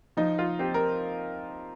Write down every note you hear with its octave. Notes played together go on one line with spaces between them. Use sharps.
F3 D#4
F4
C4 G4
A#4